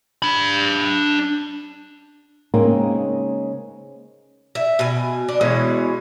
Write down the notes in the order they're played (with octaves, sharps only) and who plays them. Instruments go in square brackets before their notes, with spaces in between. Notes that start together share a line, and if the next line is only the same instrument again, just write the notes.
[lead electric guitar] D4 B5
[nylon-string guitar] C#3 G#3 A#3 C4 D#4
[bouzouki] E5
B2 G#5
D4
B2 E3 G#3 C#4